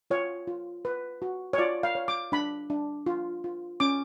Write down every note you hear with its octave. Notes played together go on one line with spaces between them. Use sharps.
F4 C#5
F4
B4
F#4
C#5
F4 D5
F5
C#5
D6
D4 B5
D4
F4
F4
C#4 D6